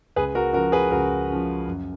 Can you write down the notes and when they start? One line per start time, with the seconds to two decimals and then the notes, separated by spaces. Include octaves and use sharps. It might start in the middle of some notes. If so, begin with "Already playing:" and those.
0.16 C#2 G#4 B4
0.35 F#4 A#4
0.53 C#3 F3 F#4 A#4
0.72 G#4 B4
0.91 C#2 F#4 A#4
1.30 C#3 F3
1.67 F#2